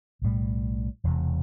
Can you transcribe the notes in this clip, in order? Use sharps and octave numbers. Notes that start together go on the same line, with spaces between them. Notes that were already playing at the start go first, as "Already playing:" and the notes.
B1 A2 G3
E1 E2 C3